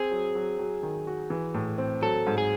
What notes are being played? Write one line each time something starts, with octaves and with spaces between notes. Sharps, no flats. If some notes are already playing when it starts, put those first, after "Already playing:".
Already playing: C4 G#4
F#3
F#3
F#3
D#3
F#4
E3
A2
C4
F#3 A4
G#2
G#4